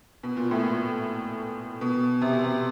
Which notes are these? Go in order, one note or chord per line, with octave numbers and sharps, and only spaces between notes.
B2
A#2
A2
A#2
B2
C3
B2
C3